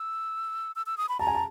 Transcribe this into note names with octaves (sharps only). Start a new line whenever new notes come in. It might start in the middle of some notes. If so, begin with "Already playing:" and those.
Already playing: E6
E6
E6
D#6
B5
A5 A#5
G#5
A5